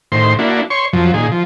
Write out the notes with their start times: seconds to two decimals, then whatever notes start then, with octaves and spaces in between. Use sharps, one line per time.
0.12 A2 D#3 C5 C6
0.39 A#3 D4 E4 F#4
0.70 C#5 C6 C#6
0.93 F2 F3 F#3
1.14 A#2 D#3 G#4
1.32 F3